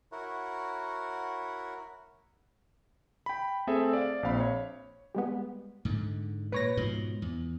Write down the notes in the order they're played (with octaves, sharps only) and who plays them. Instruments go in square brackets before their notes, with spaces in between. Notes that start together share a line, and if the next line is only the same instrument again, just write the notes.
[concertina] E4 F#4 A#4 C#5 F#5
[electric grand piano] G5 B5
A3 C4 G#4 A4 E5
D5 F5
A#1 C4 F5 B5
C#5
[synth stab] G3 G#3 B3
[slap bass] G#2 D3
[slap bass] A#2 [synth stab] B4 C#5 A#6
[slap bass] G#2 B2 F3
E2